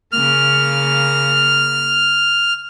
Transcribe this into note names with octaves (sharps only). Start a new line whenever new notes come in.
C#3 A#3 F6